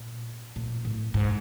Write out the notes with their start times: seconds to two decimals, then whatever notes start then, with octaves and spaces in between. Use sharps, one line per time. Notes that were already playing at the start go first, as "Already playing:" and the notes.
Already playing: A#2
0.56 A#2
0.85 A2
1.14 G#2